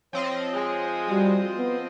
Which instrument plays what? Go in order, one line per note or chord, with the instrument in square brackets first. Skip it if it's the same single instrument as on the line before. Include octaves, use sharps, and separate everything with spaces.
[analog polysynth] F3 C4 D#5 [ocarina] C#5
[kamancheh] G#3
[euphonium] G3 [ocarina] F#4
[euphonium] B3